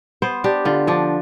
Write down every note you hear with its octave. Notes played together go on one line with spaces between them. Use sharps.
B3 C5
D4 G4
D3 F4
F3 D4